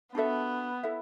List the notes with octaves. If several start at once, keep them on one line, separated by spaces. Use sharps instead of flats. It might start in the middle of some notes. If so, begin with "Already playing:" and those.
B3 D4 F#4 A4 E5
E4 A4 E5